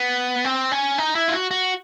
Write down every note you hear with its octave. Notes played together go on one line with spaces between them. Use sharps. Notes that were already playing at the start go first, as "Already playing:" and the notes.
Already playing: B3
C4
C#4
D#4
E4
F4
F#4
F#4